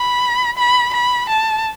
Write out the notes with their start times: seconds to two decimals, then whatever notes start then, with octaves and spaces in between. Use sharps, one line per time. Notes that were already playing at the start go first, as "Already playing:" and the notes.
Already playing: B5
0.58 B5
0.93 B5
1.29 A5